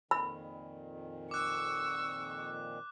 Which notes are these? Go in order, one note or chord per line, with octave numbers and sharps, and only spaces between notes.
F2 A#2 D#3 B5
C#6 D6 E6 F#6